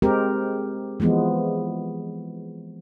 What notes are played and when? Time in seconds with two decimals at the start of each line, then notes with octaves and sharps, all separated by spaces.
0.02 G#3 C4 G4 A#4
1.00 E3 F3 G#3 B3